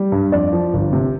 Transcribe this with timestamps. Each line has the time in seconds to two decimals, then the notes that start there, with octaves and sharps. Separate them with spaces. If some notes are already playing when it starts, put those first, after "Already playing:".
Already playing: G3
0.12 G2
0.32 F2 D5
0.53 F3
0.73 G1
0.93 C3